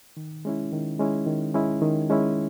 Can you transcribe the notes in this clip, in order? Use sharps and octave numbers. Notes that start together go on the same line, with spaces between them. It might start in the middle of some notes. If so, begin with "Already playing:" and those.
D#3
G#3 C#4 E4
D#3
G#3 C#4 E4
D#3
G#3 C#4 E4
D#3
G#3 C#4 E4